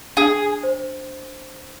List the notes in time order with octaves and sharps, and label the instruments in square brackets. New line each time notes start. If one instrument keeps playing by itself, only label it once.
[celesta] D4 [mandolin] G#4
[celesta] C5